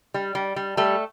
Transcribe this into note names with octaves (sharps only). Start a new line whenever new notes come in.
G3
G3
G3
G3 A3 A4